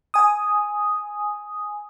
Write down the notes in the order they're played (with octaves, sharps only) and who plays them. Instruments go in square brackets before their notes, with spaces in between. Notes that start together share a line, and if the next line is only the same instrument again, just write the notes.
[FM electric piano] G#5 D#6